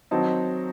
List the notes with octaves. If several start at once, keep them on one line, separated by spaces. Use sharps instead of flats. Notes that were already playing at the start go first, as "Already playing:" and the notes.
D#3 F#3 C4 D#4 A5